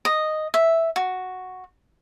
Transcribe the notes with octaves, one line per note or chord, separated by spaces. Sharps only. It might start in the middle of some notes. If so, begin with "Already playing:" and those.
D#5
E5
F#4